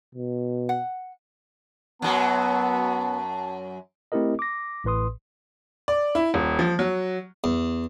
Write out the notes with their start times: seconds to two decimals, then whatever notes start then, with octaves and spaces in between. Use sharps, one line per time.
0.15 B2
0.69 F#5
2.02 F#2 F#3 B3 A5
4.12 A3 C4 E4 G4 A#4 D#5
4.39 D6 A#6
4.84 A1 A2 B4 C6 D#6
5.88 D5
6.15 E4
6.34 D#1
6.59 F3
6.79 F#3
7.44 E2